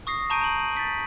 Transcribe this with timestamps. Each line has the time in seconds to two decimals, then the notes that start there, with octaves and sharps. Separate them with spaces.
0.07 C#6 D#6 A#6 C7
0.30 A5 A#5 C#6 G6 D7 D#7
0.41 A#5 F#7
0.77 A6 B6